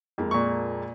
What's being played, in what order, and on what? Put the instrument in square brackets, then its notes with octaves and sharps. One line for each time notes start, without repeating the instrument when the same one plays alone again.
[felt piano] F2 G#3 A#3
[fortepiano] A#2 C#6